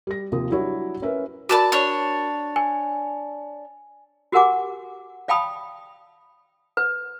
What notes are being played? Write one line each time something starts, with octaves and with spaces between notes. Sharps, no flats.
G3 A#6
D#2 C3 F3 D#6
F#3 G3 D4 E4 F#4 C#5
C#4 A#4 B4 E5
F#4 A#4 D5 A5 B5 D6
D4 C#5
G#5
F#4 G4 A#4 F#5 G#5 D6
D5 F5 G5 A5 B5 D#6
B4